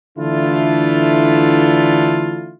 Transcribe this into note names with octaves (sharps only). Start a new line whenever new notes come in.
D3 E3 A3 D4 E4 F4